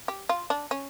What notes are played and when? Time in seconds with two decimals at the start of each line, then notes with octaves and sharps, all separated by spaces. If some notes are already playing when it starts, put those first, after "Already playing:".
0.08 G4
0.29 F4
0.50 D4
0.71 C#4